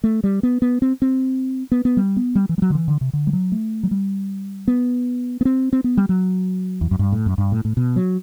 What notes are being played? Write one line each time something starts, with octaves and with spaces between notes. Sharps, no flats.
A3
G3
B3
B3
C4
C4
B3
B3
G3
B3
G3
E3
G3
F#3
D3
E3
D3
C3
D3
G3
F#3
A3
F#3
G3
B3
B3
C4
C4
B3
G3
F#3
E2
F#2
G2
A2
F#2
G2
A2
A2
B2
F#3